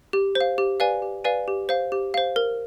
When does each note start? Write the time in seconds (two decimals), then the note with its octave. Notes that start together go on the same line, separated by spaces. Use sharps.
0.13 G4
0.35 C5
0.41 F5
0.58 G4
0.80 B4 D5 F5 G#5
1.02 G4
1.24 B4 D5 F5 G#5
1.48 G4
1.69 C5 F5
1.92 G4
2.14 C5 F5
2.36 A#4